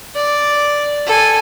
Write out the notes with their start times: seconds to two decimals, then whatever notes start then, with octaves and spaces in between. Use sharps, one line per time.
0.15 D5
1.06 A4 G#5